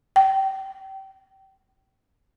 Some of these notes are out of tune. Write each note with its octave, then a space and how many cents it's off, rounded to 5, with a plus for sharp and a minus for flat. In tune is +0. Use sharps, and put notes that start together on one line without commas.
G5 -25